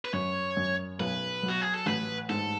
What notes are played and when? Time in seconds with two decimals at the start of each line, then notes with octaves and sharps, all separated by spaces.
0.05 B4
0.13 F#2 C#5
0.57 F#2
1.00 B1 B4
1.43 F#3
1.49 F#4
1.61 G#4
1.74 A4
1.86 A1 B4
2.29 G#2 A4